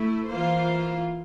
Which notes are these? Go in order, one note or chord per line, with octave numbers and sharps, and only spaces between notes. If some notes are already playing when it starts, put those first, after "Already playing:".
Already playing: A3 E4
E3 A#3 F4 C5